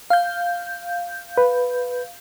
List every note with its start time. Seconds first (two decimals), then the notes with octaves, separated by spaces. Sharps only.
0.10 F5 G6
1.38 B4